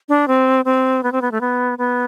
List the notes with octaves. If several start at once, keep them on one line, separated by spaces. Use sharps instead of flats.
D4
C4
C4
B3
C4
B3
A3
B3
B3